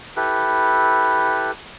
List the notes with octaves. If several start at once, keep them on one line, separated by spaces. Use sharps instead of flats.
E4 G4 A4 B4